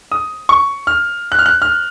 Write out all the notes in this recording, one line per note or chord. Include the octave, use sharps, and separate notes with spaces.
D#6
C#6
F6
F#6
F6
F#6
F6